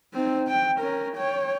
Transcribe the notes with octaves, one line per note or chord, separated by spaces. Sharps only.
C4 D#4
G5
C#4 A#4
C#5 G5